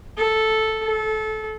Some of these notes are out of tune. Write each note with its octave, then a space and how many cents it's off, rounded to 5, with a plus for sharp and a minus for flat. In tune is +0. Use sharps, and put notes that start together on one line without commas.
A4 -5
A4 -25